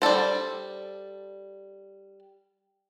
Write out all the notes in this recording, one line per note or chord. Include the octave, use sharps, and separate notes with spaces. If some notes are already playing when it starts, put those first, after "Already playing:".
G3 D4 A4 C5